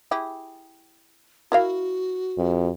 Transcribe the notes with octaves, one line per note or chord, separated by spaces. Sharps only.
E4 G4 G#4
E4 F#4 A#4 F5
F2